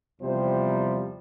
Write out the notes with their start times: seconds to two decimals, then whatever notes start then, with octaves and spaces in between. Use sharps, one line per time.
0.21 E2 C3 F3 G3 C5